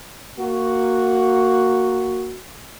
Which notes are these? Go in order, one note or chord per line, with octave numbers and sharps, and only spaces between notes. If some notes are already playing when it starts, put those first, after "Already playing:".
A#3 F#4